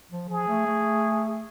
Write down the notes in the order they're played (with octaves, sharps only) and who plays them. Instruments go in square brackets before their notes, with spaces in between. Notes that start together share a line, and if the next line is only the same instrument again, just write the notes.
[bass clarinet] F3
[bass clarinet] F3 [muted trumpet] G#4
[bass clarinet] A3
A3